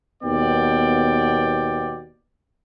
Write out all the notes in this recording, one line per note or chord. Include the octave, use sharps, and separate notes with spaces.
D#2 B2 B3 D5 G5